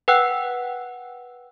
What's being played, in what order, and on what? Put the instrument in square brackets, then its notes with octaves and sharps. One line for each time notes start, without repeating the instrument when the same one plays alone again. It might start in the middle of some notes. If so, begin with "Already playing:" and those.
[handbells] B4 F#5 G5 E6 F#6